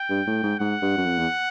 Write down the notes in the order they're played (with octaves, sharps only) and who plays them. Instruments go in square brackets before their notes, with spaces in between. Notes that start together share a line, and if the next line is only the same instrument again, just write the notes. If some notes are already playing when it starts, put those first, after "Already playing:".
Already playing: [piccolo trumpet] G5
[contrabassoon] G2
A2
G#2
[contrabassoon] G#2 [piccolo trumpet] F#5
[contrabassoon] G2
F#2
F2
E2